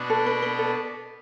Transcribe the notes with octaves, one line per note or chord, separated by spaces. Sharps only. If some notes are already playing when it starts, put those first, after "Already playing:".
Already playing: B2 B3 D4
A4
B4
B4
A4